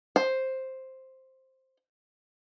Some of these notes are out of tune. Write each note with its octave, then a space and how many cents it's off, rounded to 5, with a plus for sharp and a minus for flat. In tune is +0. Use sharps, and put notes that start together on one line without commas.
C5 +5